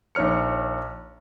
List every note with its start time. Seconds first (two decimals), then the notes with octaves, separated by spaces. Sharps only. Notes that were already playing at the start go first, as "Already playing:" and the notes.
0.15 A#1 D#4 C#5 F6 C#7